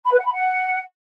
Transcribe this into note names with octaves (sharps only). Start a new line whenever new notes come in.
B5
B4
F#5
B5
F#5